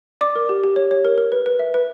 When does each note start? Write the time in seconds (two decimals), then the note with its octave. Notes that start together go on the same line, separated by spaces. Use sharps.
0.21 D5 D6
0.35 A#4
0.49 G4
0.63 G4
0.76 C#5
0.91 C#5
1.05 A#4
1.18 A#4
1.32 B4
1.46 B4
1.59 E5
1.74 B4